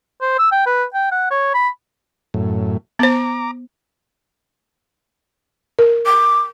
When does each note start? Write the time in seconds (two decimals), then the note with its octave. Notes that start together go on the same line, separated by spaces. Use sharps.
0.21 C5
0.39 E6
0.52 G5
0.66 B4
0.94 G5
1.12 F#5
1.31 C#5
1.54 B5
2.34 F#2 A2
2.99 B3 C5 A#5 D6
5.79 A#4
6.06 D6